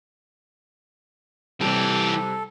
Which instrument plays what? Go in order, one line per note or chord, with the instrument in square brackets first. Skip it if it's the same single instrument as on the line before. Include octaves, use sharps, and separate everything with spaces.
[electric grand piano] C3 G3 [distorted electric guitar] E3 G4 [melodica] A4